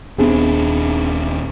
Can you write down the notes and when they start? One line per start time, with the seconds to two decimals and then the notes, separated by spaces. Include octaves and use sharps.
0.18 D#1 B3 C4 D4 G#4